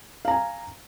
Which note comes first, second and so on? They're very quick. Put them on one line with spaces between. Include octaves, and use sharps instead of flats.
F5 A#5 G#5